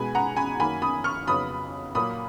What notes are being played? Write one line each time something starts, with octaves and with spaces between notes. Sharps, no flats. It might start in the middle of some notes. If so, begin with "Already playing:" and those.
Already playing: B2 G#3 B3 G#5 B5
F#5 A#5
G#5 B5
F#2 D#3 A#3 G#5 B5
B5 D#6
C#6 F6
F2 C#3 F#3 B3 B5 D#6
A#2 F#3 A#3 B5 D#6